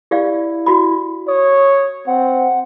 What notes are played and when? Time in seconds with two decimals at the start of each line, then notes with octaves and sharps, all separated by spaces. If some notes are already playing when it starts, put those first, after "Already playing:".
0.11 E4 G4 D5 F5
0.66 F#4 B5
1.28 C#5 D#6
2.07 C4 F#5